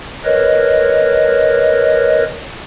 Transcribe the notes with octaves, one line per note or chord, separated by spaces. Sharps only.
A#4 B4 C#5 D#5